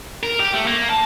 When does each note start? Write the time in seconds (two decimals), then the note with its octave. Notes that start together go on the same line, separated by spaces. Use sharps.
0.23 A#4
0.40 G4
0.53 A3
0.67 A#3
0.89 A5